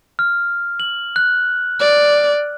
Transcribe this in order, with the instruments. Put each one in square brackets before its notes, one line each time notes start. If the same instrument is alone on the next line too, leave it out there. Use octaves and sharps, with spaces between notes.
[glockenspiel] F6
F#7
F#6
[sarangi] D5